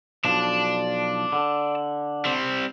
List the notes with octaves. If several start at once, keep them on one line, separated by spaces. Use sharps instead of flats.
B1 F3 D5 A5
D3
G3 C4